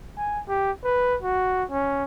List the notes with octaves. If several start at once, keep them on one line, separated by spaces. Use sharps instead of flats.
G#5
G4
B4
F#4
C#4